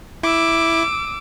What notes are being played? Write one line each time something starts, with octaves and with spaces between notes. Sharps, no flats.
E4 D6 E6